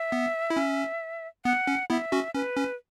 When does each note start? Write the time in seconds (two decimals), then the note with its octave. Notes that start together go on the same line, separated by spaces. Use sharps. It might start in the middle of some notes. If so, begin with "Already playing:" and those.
Already playing: E5
0.12 B3
0.50 E4
0.57 C#4
1.45 B3 F#5
1.67 C#4
1.90 B3 E4 E5
2.12 C#4 F#4
2.35 C#4 B4
2.57 C#4